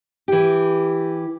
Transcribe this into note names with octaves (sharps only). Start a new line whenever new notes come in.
E3 G4